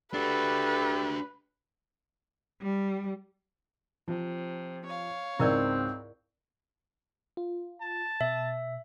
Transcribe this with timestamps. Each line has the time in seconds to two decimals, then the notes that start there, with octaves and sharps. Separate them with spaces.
0.14 D4 F#4 G4 A4 B4
2.61 G3
4.08 C3 F3
4.88 C#5 F5
5.40 C#2 G#2 C4 E4 A#4 D5
7.37 F4
7.81 A5
8.21 B2 E5